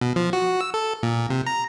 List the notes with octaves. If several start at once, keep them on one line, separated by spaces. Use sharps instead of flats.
B2
F3
F#4
E6
A4
A#2
C3
A#5